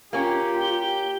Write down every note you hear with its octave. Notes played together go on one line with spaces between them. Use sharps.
A#3 C#4 F4 G4
G7